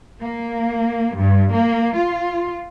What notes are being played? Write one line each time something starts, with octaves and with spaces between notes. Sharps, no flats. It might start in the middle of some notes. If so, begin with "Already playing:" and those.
A#3
G2
A#3
F4